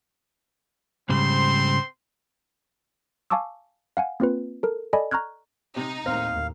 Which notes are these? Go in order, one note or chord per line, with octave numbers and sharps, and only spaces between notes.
G#2 C#3 G3 C4 C5 C6
F5 G#5 A5 C#6 D6 E6
F5 F#5 G#5
A#3 C4 F4 B4
A4 A#4
A4 D5 D#5 G#5 B5
A#5 C#6 F6 F#6 G#6
C3 D#4
D#2 A2 C4 F5